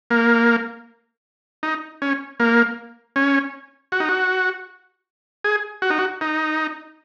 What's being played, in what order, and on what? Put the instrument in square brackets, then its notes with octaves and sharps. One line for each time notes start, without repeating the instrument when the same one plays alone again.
[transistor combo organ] A#3
D#4
C#4
A#3
C#4
F#4
D#4
F#4
G#4
F#4
D#4
F#4
D#4